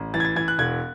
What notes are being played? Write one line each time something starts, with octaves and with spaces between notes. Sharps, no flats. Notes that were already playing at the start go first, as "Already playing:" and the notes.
Already playing: A1
E3 A6
G#6
A6
E3 G#6
F#6
E1 G#6